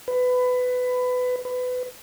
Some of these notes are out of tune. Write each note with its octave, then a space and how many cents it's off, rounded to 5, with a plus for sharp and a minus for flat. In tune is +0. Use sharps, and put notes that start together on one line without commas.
B4 +20
B4 +25